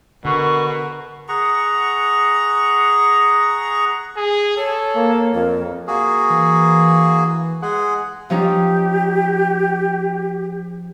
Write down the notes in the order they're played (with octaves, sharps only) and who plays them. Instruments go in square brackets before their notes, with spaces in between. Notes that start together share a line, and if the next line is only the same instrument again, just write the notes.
[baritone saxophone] B2 [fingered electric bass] D3 [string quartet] A#4 [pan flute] C#6
[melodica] G#4 F#5 A#5 C#6
[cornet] G#4
[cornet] A4 [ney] C#5
[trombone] A#3
[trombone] F2 [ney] A#4
[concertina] A#3 F#4 G#4
[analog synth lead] E3
[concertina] G#3 G#4 [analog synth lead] F#5
[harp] F3 C#4 D#4 [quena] G4